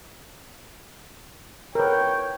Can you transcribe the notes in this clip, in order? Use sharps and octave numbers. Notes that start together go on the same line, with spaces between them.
A#4 B4 C#5 G5